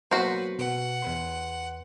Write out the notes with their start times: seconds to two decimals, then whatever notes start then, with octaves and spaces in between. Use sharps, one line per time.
0.11 F#3 A#3 B3 F#4 B4 C5
0.59 B2 B4 F#5
1.02 E2 B4 C6